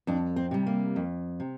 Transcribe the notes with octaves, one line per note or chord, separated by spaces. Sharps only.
F2 D4
C4
C3 G3
A#3
F2
C3